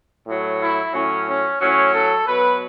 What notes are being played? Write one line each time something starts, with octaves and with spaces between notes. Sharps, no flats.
A2 F#3
E4
A2 F#3 C#4
C#4
A2 F#3 C#4
A4
B2 F#3 B4